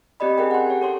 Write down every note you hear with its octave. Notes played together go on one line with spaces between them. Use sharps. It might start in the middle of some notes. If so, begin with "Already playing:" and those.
C4 G4 D5 D#5 B5
C#4 G#4 A#4 G5
F#5 C6
G4 C#5
A4 C#5 C6